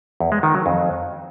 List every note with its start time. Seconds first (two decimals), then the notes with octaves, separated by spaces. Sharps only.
0.20 E2
0.32 G#3
0.43 D#3
0.54 F#3
0.66 F2